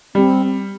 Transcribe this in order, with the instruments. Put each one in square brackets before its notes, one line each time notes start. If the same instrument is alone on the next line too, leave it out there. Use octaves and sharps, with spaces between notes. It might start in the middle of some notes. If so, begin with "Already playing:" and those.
[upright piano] G3 [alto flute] C4